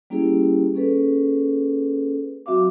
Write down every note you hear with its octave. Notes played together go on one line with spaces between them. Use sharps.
G3 A#3 C#4 E4 G4 G#4
A#3 C#4 G#4 A4 B4
F#3 C4 F#4 E5 F5 D6